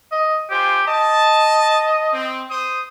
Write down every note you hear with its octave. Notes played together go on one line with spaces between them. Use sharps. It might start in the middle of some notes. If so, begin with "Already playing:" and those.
D#5
F4 G4 C5 G#5
D#5 A5
C4
C5 D#6